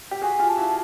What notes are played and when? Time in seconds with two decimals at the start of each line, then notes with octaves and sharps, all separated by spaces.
0.11 G4
0.22 F#4 G#4 G#5
0.39 F4 G4
0.49 A5
0.56 E4 F#4